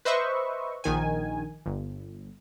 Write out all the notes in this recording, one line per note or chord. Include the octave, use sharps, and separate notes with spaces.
B4 C5 D#5 E5 C#6
A#1 D#3 G#5
G1